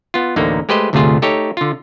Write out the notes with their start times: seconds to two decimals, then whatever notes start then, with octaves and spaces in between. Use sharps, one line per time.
0.14 B3 F4
0.36 A1 D2 A2 D3 A#3 D#4
0.69 G#3 A3 G4 B4 C5 D#5
0.93 G1 D2 C3 A3 F4 G#4
1.22 A3 D#4 G4 A4 C#5
1.57 D3 F4